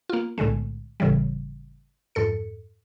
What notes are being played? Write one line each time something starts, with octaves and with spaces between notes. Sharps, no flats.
A#3 F4
B1 A2 D3 G#3 A3
G1 A2 C#3 E3 G3
F2 G#2 A4 C#7